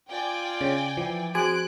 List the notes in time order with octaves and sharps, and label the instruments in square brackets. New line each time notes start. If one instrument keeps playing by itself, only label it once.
[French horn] F4 [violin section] D5 G5 G#5
[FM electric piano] C#3 [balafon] C#5
[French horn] E3 [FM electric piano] F3
[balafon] F3 F#4 G#4 [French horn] C4 [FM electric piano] G#5 [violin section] F#6 D7